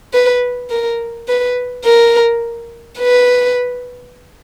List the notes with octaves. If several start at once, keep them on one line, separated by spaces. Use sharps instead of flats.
B4
A#4
B4
A#4
B4